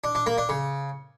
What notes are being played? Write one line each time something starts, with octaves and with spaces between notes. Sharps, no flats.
D4
D4
A#3
D4
C#3